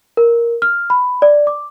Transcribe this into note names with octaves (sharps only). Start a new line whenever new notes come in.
A#4
F6
B5
D5
D6